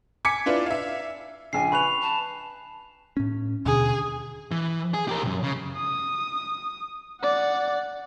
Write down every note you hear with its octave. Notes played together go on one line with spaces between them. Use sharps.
G#5 D6 G#6 B6 C#7
D4 E4 F4 B4 D5
E5 F5
A#1 C#3 G#5 C7
B4 B5 C#6 F#6 F7
A5
A2 C#4
D#2 B2 D3 G#4
E3
G#4
G4 A#4
B1 F#2
C#3
D#6
D5 F#5